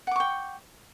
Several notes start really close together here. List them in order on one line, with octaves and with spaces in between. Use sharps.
F#5 D6 C#6 G5